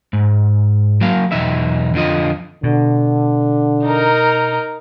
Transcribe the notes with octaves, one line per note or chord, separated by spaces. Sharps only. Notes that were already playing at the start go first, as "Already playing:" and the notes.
G#2
F#3 A#3 F5
B1 E2 D#4 E5
F2 D3 F4 D#5
B2 D3
D#4 A#4